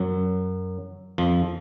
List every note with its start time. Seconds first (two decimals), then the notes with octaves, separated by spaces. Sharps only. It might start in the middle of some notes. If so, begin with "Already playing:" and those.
Already playing: F#2 F#3
1.18 F2 F3